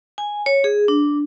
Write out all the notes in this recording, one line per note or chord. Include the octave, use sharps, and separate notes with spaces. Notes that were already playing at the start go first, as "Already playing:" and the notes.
G#5
C#5
G#4
D4